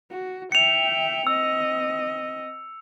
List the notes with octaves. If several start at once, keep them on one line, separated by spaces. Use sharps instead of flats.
F#4
E5 G5 C#7 F7
C4 D#5 E6